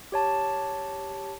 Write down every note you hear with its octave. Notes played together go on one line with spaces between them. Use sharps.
G4 C#5 A5